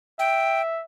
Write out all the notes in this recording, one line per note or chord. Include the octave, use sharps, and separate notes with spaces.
E5 G5